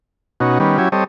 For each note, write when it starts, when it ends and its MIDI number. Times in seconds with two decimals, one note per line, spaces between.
0.40 0.58 47
0.40 0.58 61
0.40 0.58 63
0.40 0.58 66
0.60 0.78 51
0.60 0.78 55
0.60 0.78 59
0.60 0.78 61
0.78 0.89 54
0.78 0.89 61
0.78 0.89 64
0.78 0.89 67
0.78 0.89 80
0.92 1.04 55
0.92 1.04 60
0.92 1.04 69
0.92 1.04 73
0.92 1.04 75